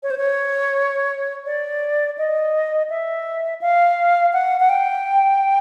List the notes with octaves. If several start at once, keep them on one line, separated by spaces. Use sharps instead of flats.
C#5
C5
C#5
D5
D#5
E5
F5
F#5
F#5
G5